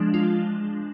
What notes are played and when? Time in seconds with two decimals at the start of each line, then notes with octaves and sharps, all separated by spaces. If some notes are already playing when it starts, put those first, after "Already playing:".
Already playing: F3 G#3 D4
0.14 F4